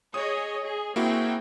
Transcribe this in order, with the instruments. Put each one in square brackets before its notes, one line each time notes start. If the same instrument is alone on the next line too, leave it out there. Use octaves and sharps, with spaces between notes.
[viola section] G#4 C#5 D#5 [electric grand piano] D#6
[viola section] G#4
[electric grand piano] A#3 E4 F#4 [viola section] C4 G#4 G5